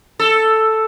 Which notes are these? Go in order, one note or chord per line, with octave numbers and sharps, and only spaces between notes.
A4